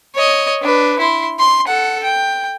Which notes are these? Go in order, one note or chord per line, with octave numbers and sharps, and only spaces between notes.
C#5 D#5
D4 B4
E4 C6
C6
A4 F#5
G5